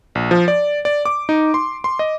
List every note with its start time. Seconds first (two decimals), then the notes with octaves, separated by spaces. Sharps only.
0.15 A#1
0.31 F3
0.48 D5
0.85 D5
1.05 D6
1.29 D#4
1.54 C6
1.84 C6
1.99 D#5